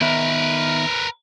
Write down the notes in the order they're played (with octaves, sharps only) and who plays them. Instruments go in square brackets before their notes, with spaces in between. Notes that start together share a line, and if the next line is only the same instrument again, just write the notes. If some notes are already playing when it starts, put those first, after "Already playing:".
[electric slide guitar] D#3 B3 E5 [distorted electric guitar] A#4 B4